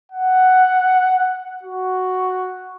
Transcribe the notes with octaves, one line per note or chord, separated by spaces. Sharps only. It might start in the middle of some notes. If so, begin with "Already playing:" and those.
F#5
F#4